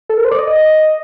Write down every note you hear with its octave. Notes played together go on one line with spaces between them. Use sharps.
A4
A#4
C5
D5
D#5